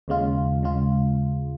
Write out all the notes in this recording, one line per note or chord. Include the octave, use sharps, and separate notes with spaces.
D#2 C#3 G#3 F4
C#3 G#3 F4